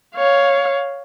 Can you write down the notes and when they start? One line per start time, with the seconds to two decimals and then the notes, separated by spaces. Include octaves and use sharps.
0.16 C#5 F5